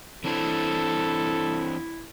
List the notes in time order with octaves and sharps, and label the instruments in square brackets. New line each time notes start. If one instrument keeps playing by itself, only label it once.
[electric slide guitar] E3 C4 D4 [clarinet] E4 [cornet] A4